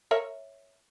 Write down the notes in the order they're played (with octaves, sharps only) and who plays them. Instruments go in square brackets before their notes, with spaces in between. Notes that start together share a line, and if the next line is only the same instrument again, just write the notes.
[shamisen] A#4 C#5 E5